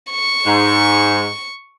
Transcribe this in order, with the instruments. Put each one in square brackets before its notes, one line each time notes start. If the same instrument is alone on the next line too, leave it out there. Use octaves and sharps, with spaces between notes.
[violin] C#6
[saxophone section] G#2